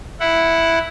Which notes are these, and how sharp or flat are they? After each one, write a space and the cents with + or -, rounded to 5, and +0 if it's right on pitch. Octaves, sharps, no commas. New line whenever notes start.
E4 +0 F#5 +0